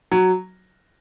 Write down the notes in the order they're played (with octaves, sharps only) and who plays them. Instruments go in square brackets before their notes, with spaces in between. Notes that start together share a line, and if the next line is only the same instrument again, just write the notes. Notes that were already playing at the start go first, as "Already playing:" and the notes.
[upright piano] F#3